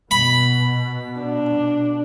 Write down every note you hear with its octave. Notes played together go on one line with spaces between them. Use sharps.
B2 B5
D4